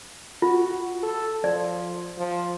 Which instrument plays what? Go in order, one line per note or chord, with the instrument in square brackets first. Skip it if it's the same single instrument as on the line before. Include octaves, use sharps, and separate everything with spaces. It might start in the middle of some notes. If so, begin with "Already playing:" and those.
[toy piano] F4 [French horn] F#4
[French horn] A4
[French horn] F3 [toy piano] D5
[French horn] F3